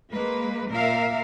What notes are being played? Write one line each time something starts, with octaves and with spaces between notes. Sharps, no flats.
G#3 A#3 B4
A#2 A#4 E5 F5